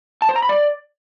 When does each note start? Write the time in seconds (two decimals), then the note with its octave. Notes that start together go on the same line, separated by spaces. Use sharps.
0.22 A5
0.29 C5
0.36 A#5
0.42 B5
0.49 D5